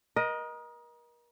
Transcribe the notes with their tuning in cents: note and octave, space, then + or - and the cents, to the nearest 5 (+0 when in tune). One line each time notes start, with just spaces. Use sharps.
A#4 +35 D#5 +0